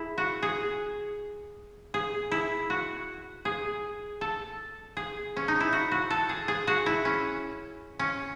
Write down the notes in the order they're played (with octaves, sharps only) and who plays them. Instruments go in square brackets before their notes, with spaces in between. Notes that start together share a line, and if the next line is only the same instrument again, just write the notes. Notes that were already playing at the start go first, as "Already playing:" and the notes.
Already playing: [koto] E4 G#4
F#4
G#4
G#4
E4
F#4
G#4
A4
G#4
C#4
D#4
E4
F#4
F#4
A4
G#4
G#4
F#4
E4
C#4
C#4